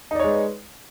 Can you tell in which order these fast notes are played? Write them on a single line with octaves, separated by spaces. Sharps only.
D#4 D5 C#5 G#3 B4